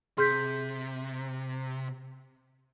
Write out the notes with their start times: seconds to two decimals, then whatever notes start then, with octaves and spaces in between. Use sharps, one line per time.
0.18 C3 G#4 C6 G6 B6